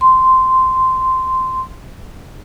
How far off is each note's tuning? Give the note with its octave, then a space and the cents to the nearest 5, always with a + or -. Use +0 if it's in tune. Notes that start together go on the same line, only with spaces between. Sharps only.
C6 -10